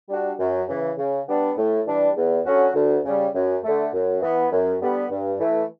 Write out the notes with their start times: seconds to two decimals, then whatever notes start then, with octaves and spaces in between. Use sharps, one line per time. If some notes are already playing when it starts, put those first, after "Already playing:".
0.09 G3 D4 F#4
0.39 F#2
0.68 C#3 E3
0.98 C#3
1.28 G3 B3 D4
1.57 A2
1.87 E3 G3 D4
2.16 E2
2.45 D3 F#3 C#4 F#4
2.75 D2
3.05 C#3 G3
3.34 F#2
3.64 D3 A3
3.93 F#2
4.22 E3 B3
4.52 F#2
4.82 D3 G3 B3
5.11 G2
5.40 E3 A3